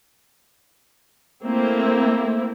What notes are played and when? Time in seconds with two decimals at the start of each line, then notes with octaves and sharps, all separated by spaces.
1.44 A3 A#3 C4 E4